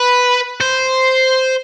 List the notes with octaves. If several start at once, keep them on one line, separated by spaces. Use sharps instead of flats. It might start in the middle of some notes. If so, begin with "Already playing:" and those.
Already playing: B4
C5